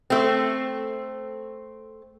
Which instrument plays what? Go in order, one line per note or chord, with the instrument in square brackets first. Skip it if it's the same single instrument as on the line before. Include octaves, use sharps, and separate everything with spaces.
[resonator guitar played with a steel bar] A3 C4